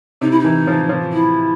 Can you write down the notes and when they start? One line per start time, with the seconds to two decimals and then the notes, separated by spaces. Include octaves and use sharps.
0.21 C3 D#4
0.31 E4
0.39 D#4
0.44 E3
0.67 F3
0.89 F3
1.13 E4